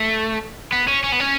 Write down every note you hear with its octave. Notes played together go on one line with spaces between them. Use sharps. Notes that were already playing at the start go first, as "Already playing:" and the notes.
Already playing: A3
B3
C#4
C#4
B3
C#4